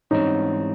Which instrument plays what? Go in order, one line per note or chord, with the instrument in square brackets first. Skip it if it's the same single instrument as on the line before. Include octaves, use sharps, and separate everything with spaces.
[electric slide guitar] G#2 E3 G3 C4 [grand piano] C#4 D#4